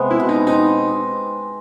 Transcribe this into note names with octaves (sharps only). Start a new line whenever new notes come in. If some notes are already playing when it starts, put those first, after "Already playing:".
Already playing: C3 G#3 B3
E4
B2
D#4
C4 D#4